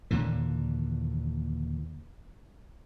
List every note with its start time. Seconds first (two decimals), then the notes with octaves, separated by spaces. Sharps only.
0.11 D#2 A#2 D3 E3